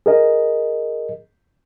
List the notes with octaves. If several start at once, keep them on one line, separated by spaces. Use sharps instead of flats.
G#4 A#4 D#5